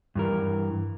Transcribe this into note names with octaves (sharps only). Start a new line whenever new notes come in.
G2 E3 A#4